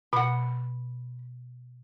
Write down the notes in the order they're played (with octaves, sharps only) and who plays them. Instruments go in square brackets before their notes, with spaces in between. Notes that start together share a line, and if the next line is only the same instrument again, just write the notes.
[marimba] B2 [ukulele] F#5 B5